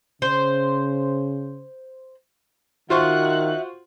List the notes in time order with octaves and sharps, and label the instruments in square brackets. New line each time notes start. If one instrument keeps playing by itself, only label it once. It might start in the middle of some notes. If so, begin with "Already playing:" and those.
[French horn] C#3 [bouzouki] C5
[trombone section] D#3 [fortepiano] F4 C5 C#6 [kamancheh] F#4 F#6 [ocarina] E5